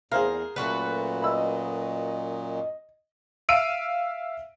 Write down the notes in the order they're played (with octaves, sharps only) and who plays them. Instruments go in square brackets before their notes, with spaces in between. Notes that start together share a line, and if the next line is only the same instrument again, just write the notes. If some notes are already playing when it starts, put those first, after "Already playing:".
[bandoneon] E2 [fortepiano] G#4 C5 F5 [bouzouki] A#4
[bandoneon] F#2 A#2 [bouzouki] A3 F#4 B4
[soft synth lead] D#5 [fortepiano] B5 E6
[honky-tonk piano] E5 F5 E6 D7 D#7